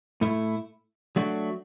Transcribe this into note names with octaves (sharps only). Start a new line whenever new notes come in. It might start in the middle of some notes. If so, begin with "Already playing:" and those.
A2 A3 E4
F#3 A3 D4 F#4